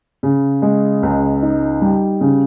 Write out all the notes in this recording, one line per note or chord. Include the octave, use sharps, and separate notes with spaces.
C#3
G#3
C#2
D#4
G3
C#3